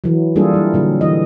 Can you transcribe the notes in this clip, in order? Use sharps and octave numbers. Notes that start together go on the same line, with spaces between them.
E3 F#3
G3 A#3 D4 F4 G#4 A4
G3 E4
A#2 D3 F#3
E3 D#5